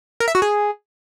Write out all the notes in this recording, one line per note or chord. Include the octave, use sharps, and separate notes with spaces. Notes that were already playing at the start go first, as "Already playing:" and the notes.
A#4
E5
F#4
G#4